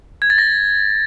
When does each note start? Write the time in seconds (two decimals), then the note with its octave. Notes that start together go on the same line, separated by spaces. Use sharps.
0.22 G#6
0.30 A6
0.38 A#6